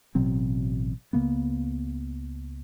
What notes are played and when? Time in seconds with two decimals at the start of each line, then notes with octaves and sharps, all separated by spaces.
0.15 A1 B2 F#3 C4
1.13 C#2 C#3 A#3 B3